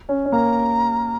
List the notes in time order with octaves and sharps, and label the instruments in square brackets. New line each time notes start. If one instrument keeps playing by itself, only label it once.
[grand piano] C#4
C#4
[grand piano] A#3 [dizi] A#5